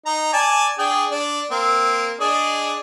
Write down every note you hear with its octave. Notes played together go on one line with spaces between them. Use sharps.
D#4 A#5
D5 G#5 A5
D4 G#4 G5
D4
A#3 C4
D4 G#4 D#5